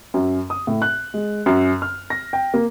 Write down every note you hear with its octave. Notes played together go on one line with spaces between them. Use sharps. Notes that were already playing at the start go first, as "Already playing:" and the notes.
F#2
D#6
A2
F#6
G#3
F#2
F6
A#6
G5
A#3